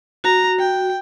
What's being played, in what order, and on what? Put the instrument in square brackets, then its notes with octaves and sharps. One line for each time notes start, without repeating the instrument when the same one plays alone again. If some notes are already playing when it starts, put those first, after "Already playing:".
[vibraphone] F#4 [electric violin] A#5
[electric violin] G5